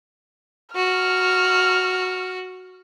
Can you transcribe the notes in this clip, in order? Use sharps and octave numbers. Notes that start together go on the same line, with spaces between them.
F#4 F6